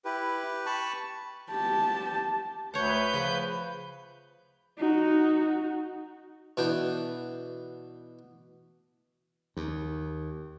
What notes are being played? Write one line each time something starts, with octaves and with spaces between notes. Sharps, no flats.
E4 G4 B4
A5 B5 C#6
G4 A5
D2 B4 C#5 F#5 G6
C#3 F3
D#4 F#4
B2 E3 D4 G5
D#2